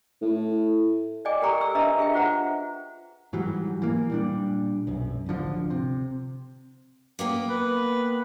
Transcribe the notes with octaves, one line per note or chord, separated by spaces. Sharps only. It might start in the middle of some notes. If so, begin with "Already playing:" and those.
A2
D5 D#5 G5 G#5 D6
G4 A4 A#4 G5 A#5 C#6
E6
D4 B4 D#5 E5 A#5
G#4 E5 G5
F4 C5 F#5 A#5
G#2 E3 F#3 G3
E3 A#3
A#2 G3 D4
B1 F#2
D1 G#1 D3 F3
C3
A#3 B3 G5
B4